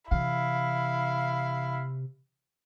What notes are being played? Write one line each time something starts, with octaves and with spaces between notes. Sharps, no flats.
C3 E3 E4 F5